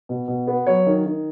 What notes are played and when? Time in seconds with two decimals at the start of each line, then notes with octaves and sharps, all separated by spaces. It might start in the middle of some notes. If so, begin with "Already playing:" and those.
0.09 B2
0.28 B2
0.47 B3
0.67 F#3 C#5
0.86 D#3
1.06 D#3